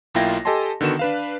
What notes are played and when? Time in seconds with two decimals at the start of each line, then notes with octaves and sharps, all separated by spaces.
0.15 B1 A#3 E4 F4 G5 A#6
0.45 G4 A4 D#5 G#5 A5 C6
0.81 D3 D#3 B3 F#4 E7
0.99 D4 B4 F5